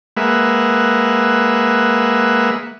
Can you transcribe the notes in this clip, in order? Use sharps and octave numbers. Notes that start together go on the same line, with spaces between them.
G#3 A#3 B4 E5 F#5